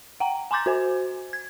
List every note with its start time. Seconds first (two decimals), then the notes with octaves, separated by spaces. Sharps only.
0.20 F#5 G5 A#5
0.51 G#5 A#5 C6 D6 G6 A6
0.66 F#4 C5 G#5
1.33 G#6